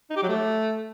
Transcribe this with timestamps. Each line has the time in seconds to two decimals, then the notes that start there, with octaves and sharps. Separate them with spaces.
0.10 D#4
0.16 G4
0.23 F#3
0.29 A3